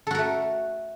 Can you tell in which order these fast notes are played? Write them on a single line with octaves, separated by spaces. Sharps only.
A4 F#4 A#4 A3